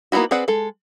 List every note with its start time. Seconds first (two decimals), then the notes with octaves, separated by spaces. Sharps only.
0.12 A#3 B3 D#4 E4 F#4
0.31 C4 G#4 B4 D5 F#5
0.48 G#3 A4